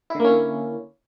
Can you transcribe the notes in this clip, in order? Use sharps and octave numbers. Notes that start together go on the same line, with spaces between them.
D3 A#3 C#4 E4